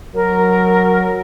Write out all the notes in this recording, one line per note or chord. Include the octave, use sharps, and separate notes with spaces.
F#3 A#4